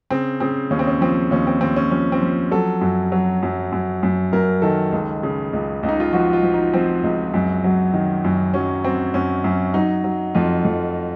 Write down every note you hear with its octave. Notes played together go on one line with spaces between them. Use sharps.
C#3 C4
C#3 C4
D#2 C#4
C4
C#4
F3 C4
D#2 C#4
C4
D#2 C4
C#4
F3 C#4
C4
F3
F#3 A4
F#2
F#3
F#2
F#2
F#2
F#2 A#4
D#3 A4
C#2
C#3
C#2
C#2
D#4
F4
F3 F#4
F4
F3
D#4
F3 C4
C#2
F#2
F#3
D#3
F#2
F#3 C#4
F#3 C4
F#2 C#4
F#2
F#3 D#4
F#3
F2 F4
F2